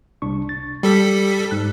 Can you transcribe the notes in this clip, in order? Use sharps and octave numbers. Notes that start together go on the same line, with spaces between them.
C2 D4 C#6
A6
G3 G4 A4 B6
G#2 F#6